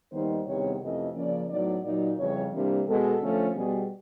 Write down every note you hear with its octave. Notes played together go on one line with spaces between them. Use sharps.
D#2 D#3 G3 B3 D#4 C5
E2 C3 D#3 G3 B3 C#5
F2 C3 E3 A3 C#4 D#5
C#3 F3 A#3 C#4 D5
A2 F#3 B3 D#4 D5
A#2 F#3 A#3 D#4 D5
F2 C#3 E3 G3 C#5
C3 E3 G3 A#3 D4 C5
B2 G#3 B3 A4
D3 F3 A3 C#4
B2 G3 B3 G#4